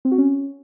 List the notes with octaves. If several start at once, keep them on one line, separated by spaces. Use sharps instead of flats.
C4
F#4
C#4